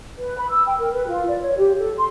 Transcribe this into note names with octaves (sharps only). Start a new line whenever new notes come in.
B4
B5
E6
G5
A#4
B4
F4
D5
C#5
G4
A4
C6